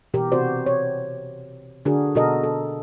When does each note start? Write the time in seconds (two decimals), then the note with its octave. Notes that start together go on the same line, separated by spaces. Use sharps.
0.14 B2 E3 G4 A#4
0.32 C3 C4 F#4 C5 D5
0.66 C#5
1.85 D3 D4 F#4 G#4 A#4
2.15 B2 F#4 A4 A#4 D#5
2.44 A4